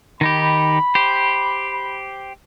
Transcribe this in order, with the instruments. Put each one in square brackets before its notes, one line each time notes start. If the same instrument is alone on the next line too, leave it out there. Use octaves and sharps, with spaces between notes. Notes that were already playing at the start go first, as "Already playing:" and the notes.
[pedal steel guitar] D#3 D#4 G4 [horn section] B5
[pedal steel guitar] G4 C5